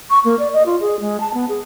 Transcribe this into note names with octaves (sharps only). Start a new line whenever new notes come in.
C#6
A#3
D5
D#5
F4
G#4
G#3
A5
B3
G#4